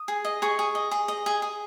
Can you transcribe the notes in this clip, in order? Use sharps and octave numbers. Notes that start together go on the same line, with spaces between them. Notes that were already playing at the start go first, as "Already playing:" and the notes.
Already playing: D#6
G#4
D#5
G#4 C#6
G#4
D#5
G#4
D#5
G#4
G#4